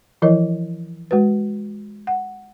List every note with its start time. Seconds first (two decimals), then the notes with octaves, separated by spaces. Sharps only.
0.22 E3 F3 E4 A#4 C#5 D#5
1.11 G#3 F#4 B4
2.07 F#5